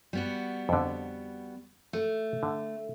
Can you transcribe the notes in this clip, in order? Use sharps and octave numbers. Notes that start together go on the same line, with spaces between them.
G3 B3 F#4
F2 D3
A3
D3